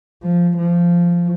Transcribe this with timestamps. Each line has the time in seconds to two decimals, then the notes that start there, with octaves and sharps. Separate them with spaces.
0.23 F3
0.57 F3